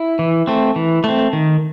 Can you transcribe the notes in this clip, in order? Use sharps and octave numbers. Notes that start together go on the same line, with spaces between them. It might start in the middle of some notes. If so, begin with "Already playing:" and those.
Already playing: E4
E3
A3 C4
E3
A3 C4
D#3